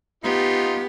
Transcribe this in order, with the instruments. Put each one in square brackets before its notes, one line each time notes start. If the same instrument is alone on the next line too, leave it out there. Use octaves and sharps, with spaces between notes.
[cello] B3 G4 [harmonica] D#4 F4